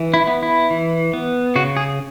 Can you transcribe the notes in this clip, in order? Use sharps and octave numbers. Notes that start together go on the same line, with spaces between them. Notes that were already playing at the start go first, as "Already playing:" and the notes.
Already playing: E3
E4
B3
E4
E3
B3
C#3 F#4
G#4